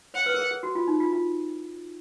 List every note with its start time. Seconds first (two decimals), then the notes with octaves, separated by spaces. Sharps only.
0.14 C#5 F#5
0.26 B4
0.34 A#4
0.38 G#4
0.51 G#4
0.63 F#4
0.75 F4
0.88 D#4
1.00 F4
1.13 F4